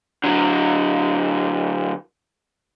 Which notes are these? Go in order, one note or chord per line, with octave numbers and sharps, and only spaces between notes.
D3 F#3